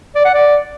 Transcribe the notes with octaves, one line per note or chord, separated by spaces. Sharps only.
D5
F#5
D5